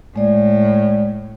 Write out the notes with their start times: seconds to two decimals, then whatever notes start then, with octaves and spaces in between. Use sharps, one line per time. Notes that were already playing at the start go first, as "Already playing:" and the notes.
0.16 A2 G#3 D5